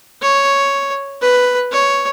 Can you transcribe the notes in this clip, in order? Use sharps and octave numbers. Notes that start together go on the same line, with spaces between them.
C#5
B4
C#5